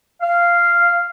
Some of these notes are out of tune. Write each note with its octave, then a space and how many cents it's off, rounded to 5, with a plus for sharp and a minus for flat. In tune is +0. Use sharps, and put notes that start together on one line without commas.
F5 -10